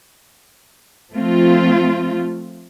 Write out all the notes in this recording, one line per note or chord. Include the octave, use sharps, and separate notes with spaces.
F3 A3 C4 F4